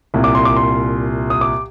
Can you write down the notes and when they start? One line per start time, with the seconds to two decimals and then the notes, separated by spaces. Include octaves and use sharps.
0.14 C2 A#2
0.24 D6
0.35 C6
0.45 D6
0.56 C6
1.30 D#6
1.41 D6